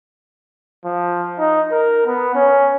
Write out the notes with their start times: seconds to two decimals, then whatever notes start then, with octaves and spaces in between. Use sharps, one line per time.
0.85 F3
1.39 D#4
1.71 A#4
2.06 B3
2.35 C#4